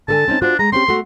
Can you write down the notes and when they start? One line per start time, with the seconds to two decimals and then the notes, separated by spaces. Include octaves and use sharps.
0.08 D3 A4 G#5 A5
0.28 C4 C#4 D#4
0.42 D4 F4 F#4 C5
0.59 G#3 A#5
0.73 C4 C#4 G4 C6
0.88 A3 F#4